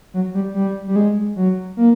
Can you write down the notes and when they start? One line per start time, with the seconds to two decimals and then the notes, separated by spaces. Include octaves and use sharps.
0.14 F#3
0.34 G3
0.54 G3
0.88 G3
0.96 G#3
1.36 F#3
1.77 A#3